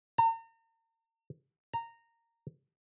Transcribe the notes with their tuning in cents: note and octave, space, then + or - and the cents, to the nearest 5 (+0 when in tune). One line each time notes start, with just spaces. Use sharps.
A#5 -40
A#5 -15